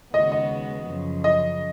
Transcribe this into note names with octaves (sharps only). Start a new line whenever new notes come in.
D#2 C#3 G#3 B3 F#4 D#5
D#5
F#2 C#3 F3
D#5